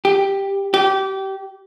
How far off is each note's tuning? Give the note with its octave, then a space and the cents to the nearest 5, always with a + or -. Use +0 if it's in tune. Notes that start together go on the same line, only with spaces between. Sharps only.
G4 +5
G4 -25